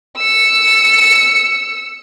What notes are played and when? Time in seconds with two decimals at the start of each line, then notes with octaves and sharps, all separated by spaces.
0.18 E6 C#7